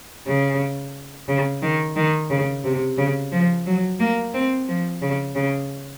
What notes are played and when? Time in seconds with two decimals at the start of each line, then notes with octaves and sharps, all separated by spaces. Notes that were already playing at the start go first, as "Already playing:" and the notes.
0.27 C#3
1.28 C#3
1.62 D#3
1.96 D#3
2.30 C#3
2.64 C3
2.98 C#3
3.32 F3
3.66 F#3
4.00 A#3
4.34 C4
4.68 F3
5.02 C#3
5.35 C#3